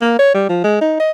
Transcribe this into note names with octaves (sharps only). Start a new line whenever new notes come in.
A#3
C#5
G3
F3
G#3
D#4
D#5